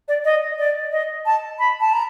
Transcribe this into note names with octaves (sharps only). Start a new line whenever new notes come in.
D5
D#5
D5
D#5
A5
B5
A5
A#5